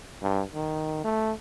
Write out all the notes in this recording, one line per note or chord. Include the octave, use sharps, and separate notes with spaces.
G2
D#3
A3